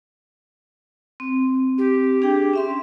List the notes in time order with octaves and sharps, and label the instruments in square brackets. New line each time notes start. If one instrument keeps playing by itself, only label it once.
[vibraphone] C4
[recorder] G4
[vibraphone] D4 G#4 G5
C#4 E5 C6